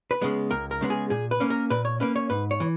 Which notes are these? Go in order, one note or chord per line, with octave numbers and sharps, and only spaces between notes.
B4
C#3 G#3 B3
C#2 A#4
A#4
C#3 G#3 B3
G#4
A#2 G#4
B4
A#3 C#4
A#4
A#2 B4
C#5
A#3 C#4 B4
C#5
G#2 B4
C#5
E3